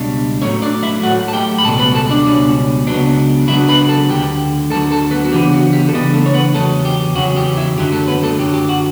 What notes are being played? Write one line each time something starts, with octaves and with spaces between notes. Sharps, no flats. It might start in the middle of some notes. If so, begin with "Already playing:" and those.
Already playing: C#2 B2 G3 D4
A2 F#3 A3 C#4 C#5
D4 D5
E4 E5
A2 F#3 A3 F#4 F#5
A5
G4 G5
B5
C#2 B2 G3 C#4 A4 A5
B4 B5
A4 A5
D4 D5
C#2 B2 G3 C#4
C#2 C#3 F#3 B3 D4
C#2 C#3 F#3 B3 D4 E4 E5
B4 B5
A4 A5
D2 D3 F#3 G4 G5
D2 D3 F#3 A4 A5
A4 A5
B3 B4
F#4
C#3 E3 B3 D4 G4
F#4
G4
A4
C#3 E3 B3 D4 G4
A3 A4
C#5
B3 B4
E2 C#3 F#3 A3 C#4 A4
G4
E2 C#3 F#3 C#4 F#4
G4
E4 E5
F#2 D3 F#3 G4
A3 A4
B3 B4
A3 A4
F#2 D3 F#3 G4
G4
F#4